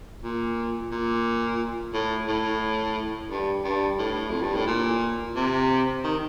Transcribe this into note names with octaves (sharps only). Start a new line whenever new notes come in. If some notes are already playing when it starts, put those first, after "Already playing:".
A#2
A#2
A2
A2
G2
G2
A2
F2
G2
A2
A#2
C3
D#3